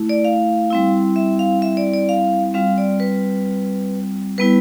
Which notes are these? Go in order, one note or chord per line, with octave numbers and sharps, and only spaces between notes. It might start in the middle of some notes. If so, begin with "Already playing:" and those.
Already playing: A3 E4
D5
F5
G3 C4 E4
E5
F5
E5
D5
D5
F5
G3 C4 F4 F5
D5
B4
G3 B3 E4 B4